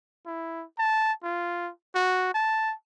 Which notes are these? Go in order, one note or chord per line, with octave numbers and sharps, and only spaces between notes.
E4
A5
F4
F#4
A5